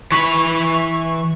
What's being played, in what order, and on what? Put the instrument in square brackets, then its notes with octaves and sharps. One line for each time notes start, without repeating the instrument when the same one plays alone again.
[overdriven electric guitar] E3 B5 [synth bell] C#6